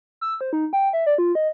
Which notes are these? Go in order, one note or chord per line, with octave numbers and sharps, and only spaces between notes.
E6
C5
D#4
G5
E5
D5
F4
D#5